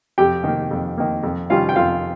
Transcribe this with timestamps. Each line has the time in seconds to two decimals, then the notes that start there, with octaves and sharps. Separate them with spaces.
0.18 F2 G4 G5
0.44 D#3 A#3
0.71 F2
0.97 D#3 A#3
1.23 F2
1.50 D#3 G3 C#4 F4 F5
1.69 G5
1.76 F2 F4 F5